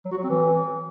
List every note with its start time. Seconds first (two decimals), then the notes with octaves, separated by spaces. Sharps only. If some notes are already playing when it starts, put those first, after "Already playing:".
0.05 F#3
0.11 F#4
0.17 F#3
0.23 C4
0.30 E3